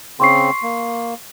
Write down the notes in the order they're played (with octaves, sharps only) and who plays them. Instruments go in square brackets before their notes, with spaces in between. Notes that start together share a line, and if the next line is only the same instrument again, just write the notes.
[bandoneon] C#3 C4 [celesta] C6 C#6 C7
[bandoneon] A#3